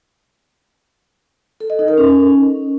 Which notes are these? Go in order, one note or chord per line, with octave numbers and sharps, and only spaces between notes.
A4
D#5
D#4
A#4
C#4